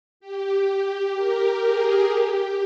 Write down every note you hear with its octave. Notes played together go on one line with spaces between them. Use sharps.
G4
G4
A#4
G#4
G4